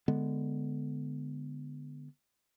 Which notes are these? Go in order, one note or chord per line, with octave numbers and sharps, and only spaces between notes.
D3 G#3 B3